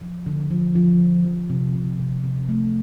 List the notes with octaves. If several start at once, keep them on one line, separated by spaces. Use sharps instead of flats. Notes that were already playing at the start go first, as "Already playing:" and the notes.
F3
D3
F3
F3
D3
F3
C3
C3
C3
C3
A3